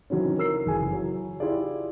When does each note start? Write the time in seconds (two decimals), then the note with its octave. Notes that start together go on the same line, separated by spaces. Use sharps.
0.10 D#3 E3 F#3 C4 C#4
0.38 A#4 E6 C7
0.66 F#1 E3 G#4 G#5
0.93 F#3
1.40 E4 F4 G4 G#4 D5